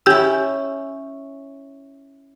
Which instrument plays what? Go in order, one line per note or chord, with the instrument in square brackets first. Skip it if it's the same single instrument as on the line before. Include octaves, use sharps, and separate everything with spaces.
[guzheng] C#4 E4 [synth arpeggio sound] G4 E6